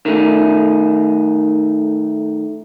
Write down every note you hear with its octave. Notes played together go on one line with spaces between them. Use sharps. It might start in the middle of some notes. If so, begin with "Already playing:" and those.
D#3 A3